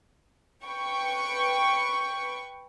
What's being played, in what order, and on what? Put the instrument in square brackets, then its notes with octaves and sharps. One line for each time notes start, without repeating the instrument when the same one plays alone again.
[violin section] B4 G5 C#6